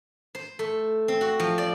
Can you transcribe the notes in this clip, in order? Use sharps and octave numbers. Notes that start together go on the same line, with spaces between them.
C5
A3
C4
F#4
F3
D5